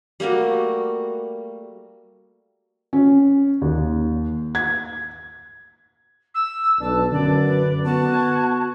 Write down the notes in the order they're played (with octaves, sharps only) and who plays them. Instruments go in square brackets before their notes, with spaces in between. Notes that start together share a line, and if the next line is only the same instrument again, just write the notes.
[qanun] G3 A3 A#3 F#4
[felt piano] C#4
D#2
G#6
[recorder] E6
[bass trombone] B1 [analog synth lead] D4 [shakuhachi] B4 [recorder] A5
[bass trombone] F#2 [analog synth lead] D3 [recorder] D5
[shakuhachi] B4
[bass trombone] B3 [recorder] F#4 [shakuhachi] A5
[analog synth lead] G#6